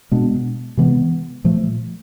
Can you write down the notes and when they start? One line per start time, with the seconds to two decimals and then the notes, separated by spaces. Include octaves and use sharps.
0.12 B2 G#3 B3 D4
0.77 C3 E3 G#3 B3
1.44 A#2 F3 A3